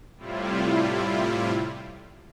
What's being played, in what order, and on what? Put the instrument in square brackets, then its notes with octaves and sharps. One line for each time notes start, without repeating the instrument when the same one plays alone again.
[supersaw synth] A2 C3 G3 E4 F4